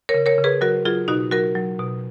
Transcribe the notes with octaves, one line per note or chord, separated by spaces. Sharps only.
A#4 C#5
C#3
A#4 C#5
C#3
G#4 B4
F#3 F#4 A#4
F#3 F4 G#4
B2 D#4 F#4
F#3 F#4 A#4
F#3
B2